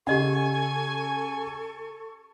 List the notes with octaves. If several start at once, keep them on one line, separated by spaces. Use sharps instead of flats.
C#3 G4 A4 D#5 F#5 G#5 C#6